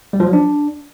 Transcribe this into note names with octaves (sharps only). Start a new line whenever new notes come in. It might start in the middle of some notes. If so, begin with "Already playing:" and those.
G3
F3
F#3
D4